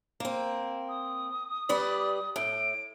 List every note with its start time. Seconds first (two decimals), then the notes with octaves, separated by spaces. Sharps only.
0.20 A#3 C4
0.89 D#6
1.69 G3 B4 D5
2.36 A2 D7